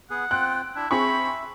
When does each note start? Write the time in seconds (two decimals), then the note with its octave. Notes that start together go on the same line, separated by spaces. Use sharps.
0.10 B3 G#4 F#5
0.31 C4 F4 G5 F#6
0.76 D4 E4
0.91 C4 G#4 E5 B5 C#6